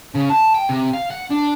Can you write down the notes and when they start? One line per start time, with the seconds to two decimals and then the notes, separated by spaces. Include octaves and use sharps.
0.15 C#3
0.29 A5
0.54 G5
0.69 C3
0.93 F5
1.10 F#5
1.30 D4